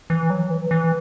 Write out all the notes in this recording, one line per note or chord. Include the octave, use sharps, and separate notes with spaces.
E3
F#3
E3
E3